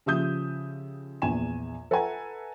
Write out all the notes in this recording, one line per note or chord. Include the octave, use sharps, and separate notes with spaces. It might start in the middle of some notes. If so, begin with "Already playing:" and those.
C#3 F3 G4 E5 D#6 G6
A#1 E2 G#5 E7
A4 B4 E5 F#5 G#5 A#5